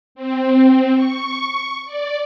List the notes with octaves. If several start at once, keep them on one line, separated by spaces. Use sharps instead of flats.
C4
C#6
D5